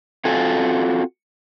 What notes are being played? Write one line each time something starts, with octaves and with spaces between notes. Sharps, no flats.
C4 F4 F#4 A4 F5 G#5